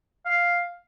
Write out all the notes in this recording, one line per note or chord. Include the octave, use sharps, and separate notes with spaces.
F5